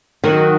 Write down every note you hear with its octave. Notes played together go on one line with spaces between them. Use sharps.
D#3 F#3 D#4 F#4